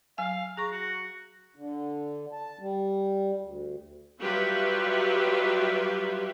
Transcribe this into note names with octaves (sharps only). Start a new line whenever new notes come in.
F#3 F5 G#5
G#4 A#5 C#6
F#4
D3
A5
G3
D2
F#3 G3 F4 G4 B4 E5